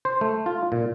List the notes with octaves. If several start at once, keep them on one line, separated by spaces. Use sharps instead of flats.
C5
A3
F4
A#2